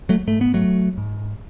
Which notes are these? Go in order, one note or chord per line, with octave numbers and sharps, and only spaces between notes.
F#3 A3
G#2 A3
B3
F#3 A3
G#2